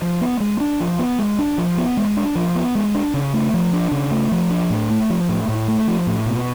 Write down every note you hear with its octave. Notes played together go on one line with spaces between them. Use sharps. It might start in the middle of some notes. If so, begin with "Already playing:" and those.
F3
B3
G#3
D4
F3
B3
G#3
D4
F3
B3
G#3
D4
F3
B3
G#3
D4
C#3
A3
F3
D4
C#3
A3
F3
D4
A2
A3
F3
A2
A2
A3
F3
A2
B2